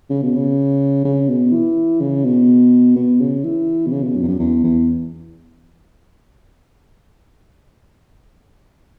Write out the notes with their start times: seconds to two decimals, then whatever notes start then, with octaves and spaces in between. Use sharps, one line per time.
0.10 C#3
0.22 B2
0.36 C#3
1.04 C#3
1.28 B2
1.52 E3
2.00 C#3
2.24 B2
2.96 B2
3.20 C#3
3.44 E3
3.86 B2
3.91 C#3
4.03 B2
4.16 F#2
4.23 E2
4.27 F#2
4.39 E2
4.64 E2